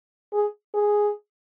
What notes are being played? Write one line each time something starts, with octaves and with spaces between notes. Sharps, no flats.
G#4
G#4